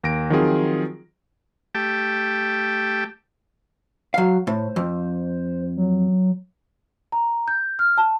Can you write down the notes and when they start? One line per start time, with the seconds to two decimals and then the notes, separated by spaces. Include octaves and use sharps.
0.04 D#2 A#6 D7
0.30 D#3 F3 F#3 C4 F4 G#4
1.75 A3 G4 G5 A5
4.14 F#3 F5
4.47 A2 C5
4.76 F2
5.77 F#3
7.12 A#5
7.48 G6
7.79 F6
7.98 A5